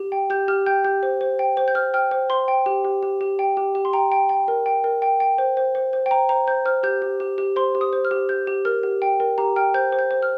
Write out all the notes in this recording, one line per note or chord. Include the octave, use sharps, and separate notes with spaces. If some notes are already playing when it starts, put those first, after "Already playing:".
Already playing: G4
G5
G4 G6
G4 F6
G5 G6
G4 G6
C5
C5
G5
C5
G6
C5 F6
G5 F6
C5
C5 C6
G5
G4
G4
G4
G4
G5
G4
G4
C6
G5 A#5
G5
G5
A#4
G5
A#4
G5
G5
C5
C5
C5
C5
G5
C5 A#5
C5 A#5
C5 G6
C5 F6
G4 G6
G4
G4
G4
C5 C6
G4
D#6
C5
F6
G4
G4 G6
G4
A#4 F6
G4
G5
A#4
G4 A#5
G5 F6
C5 G6
C5
G6
C5
F6